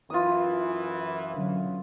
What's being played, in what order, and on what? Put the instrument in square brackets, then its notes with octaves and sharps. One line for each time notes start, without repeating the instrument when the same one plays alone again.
[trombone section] F#2 E3 [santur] F4 D#6
[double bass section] D3 F#3 C#4